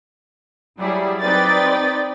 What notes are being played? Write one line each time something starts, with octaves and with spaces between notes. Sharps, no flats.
F#3 G3 E4 G#4
C4 D#4 B4 D5 G5 A6